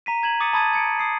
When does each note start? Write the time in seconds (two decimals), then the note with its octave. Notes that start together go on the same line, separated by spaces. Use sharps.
0.06 A#5 B6 D#7
0.23 A#5 G#6 E7 F#7
0.40 D6 D#6 A6 C#7 D#7
0.53 A5 B5 D#6 G#6 A6 D#7
0.73 G#6 C#7 D7
0.99 D#6 C7